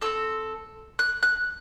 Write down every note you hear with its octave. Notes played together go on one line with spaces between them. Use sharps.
C4 F4 A4 E6
F#6
F#6